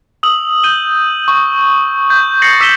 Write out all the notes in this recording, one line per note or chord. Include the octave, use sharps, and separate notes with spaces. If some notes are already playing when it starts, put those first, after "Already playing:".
D#6 E6 F#7
G6 D#7 G7
C#6
G6
G6 A6 A#6 C7 C#7 F#7
D6 E6 B6 D#7 E7 G7